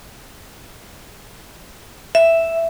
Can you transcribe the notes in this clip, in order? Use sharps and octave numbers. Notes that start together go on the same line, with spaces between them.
E5